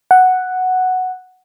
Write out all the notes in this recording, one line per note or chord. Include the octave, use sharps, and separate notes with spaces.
F#5